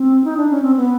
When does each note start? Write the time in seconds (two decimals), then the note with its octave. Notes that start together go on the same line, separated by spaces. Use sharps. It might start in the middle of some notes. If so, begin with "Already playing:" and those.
Already playing: C4
0.24 D#4
0.37 D4
0.50 C#4
0.62 C4
0.76 B3